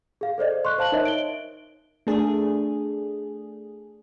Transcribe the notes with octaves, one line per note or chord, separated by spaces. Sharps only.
G#4 F5
A4 C5 D5 D#5
C6 C#6 F#6
C5 F5 A5 F#6 F#7
D#4 A#4 C#5 D#5 E5
D7 G7
A3 D4 G#4